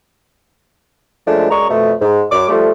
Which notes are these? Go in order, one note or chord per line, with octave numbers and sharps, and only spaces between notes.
F#2 F3 G#3 A3 D4
F#2 G#3 D5 A#5 C#6
F2 B2 A3
G#2
F#2 D6
F3 G3 A3